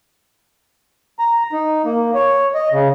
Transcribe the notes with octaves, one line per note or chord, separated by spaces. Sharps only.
A#5
D#4
A#3
C#5
D#5
C#3